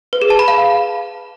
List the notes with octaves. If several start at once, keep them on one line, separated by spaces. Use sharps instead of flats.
B4
G#4
A5
B5
F5